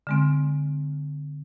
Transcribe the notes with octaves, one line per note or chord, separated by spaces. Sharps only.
D3 G#3 C4